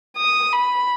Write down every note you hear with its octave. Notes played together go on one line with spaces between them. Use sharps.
D#6
B5